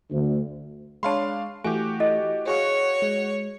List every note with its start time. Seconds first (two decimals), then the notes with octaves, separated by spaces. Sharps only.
0.11 D2
1.03 G#3 D4 C#5 F5 A5 B5 C6
1.64 E3 A3 F#4 G4 G#5
2.00 E4 A4 D#5
2.47 F#4 G#4 C#5 F5 C#6
3.02 G#3